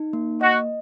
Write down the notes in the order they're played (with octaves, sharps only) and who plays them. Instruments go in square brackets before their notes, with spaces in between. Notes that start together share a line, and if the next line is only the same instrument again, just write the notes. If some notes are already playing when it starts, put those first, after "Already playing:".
Already playing: [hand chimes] D#4
A#3
[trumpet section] F#4 [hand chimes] D#5